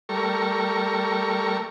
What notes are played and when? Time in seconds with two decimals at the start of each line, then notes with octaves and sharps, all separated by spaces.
0.09 G3 A3 A#4 C#6